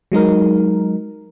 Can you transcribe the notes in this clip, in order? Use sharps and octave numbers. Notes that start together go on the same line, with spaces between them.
F#3 G#3 D#4 A#4